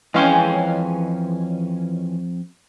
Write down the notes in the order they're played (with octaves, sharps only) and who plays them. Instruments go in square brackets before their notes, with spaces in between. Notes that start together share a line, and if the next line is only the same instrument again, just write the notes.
[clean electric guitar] F2 F5 G5 [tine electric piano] E3 [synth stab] G#3 C#4 G#5